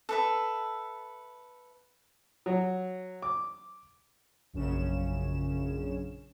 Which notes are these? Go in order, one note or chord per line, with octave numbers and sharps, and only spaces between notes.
A4 B4 E5
F#3
D6
A#1 F#2 C#3 C#4 E7